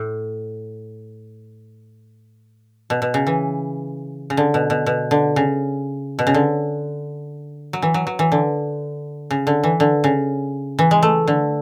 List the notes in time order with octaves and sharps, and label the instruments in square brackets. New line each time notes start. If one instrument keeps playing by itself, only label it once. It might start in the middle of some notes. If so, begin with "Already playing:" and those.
Already playing: [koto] A2
B2
B2
C#3
E3
C#3
D3
B2
B2
B2
D3
C#3
B2
C#3
D3
F#3
E3
F#3
F#3
E3
D3
C#3
D3
E3
D3
C#3
E3
G#3
A3
D3